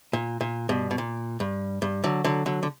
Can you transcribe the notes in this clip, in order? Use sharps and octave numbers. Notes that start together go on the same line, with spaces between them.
A#2
A#2
G2 B2
B2
A#2
G2
G2
D3 F#3
D3 F#3
D3 F#3
D3